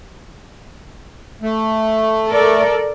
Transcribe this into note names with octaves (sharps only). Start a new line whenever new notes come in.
A3
A4 A#4 D5